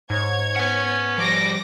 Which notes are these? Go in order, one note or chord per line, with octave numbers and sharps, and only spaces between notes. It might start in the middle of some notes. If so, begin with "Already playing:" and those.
G#2 C#5 G#6
C#4 B4 F#5
F3 G3 D6 A#6